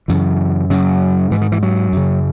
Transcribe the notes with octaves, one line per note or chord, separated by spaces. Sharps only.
F#2 C#3 E3
F#2 C#3 F#3
G#2 E3
D#3
E3
F#3
F#2 C#3